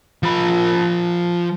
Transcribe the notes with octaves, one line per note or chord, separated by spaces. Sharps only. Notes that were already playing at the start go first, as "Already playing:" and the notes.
F3 B5